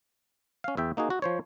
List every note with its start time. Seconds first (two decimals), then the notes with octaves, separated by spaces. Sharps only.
0.64 C#4 F5
0.77 E2 E5 G5
0.97 A#3 D#4 F#4 G#4
1.10 F#4
1.22 F3 C5 C#5